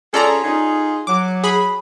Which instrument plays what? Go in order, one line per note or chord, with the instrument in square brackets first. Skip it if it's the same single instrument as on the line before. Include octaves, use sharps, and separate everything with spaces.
[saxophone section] C#4 F4 G#4 [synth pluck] A4 D5 A#5
[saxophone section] D#4 F4 G#4
[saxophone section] F#3 [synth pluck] D6
[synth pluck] G#4 B5